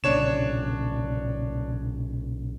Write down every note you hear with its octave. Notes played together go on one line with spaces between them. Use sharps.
B1 A#2 C#3 D4 C#5 E7